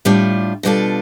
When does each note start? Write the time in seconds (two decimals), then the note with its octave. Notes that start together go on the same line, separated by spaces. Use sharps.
0.05 A2 G3 D4 F4
0.63 B2 G3 D4 F4 A4